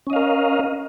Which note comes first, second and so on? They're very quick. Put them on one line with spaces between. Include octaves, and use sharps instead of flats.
C#4 D#5 F5 A#4